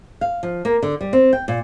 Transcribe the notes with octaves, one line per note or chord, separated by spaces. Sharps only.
F5
F3
A#3
D3
G3
C4
G5
A#2